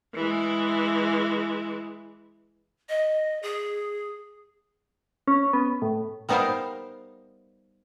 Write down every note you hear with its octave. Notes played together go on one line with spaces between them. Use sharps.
E3 G#3
D#5
G#4
C#4
B3
A2
G3 B3 D#4 A#4 C5 F5